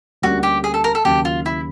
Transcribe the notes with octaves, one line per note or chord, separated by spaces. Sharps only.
D2 D3 G3 A#3 C#4 F#4
G4
G#4
A4
A#4
A4
D#2 C#3 F#3 A#3 G4
F4
E4